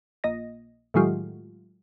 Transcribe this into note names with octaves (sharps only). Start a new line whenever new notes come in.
A#1 D#5 A#6
A2 D#3 F#3 G#3 F4 G4